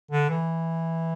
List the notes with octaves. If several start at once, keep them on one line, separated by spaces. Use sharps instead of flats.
D3
E3